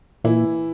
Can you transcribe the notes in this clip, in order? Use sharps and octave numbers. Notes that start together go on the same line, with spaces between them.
A#2 E3 E4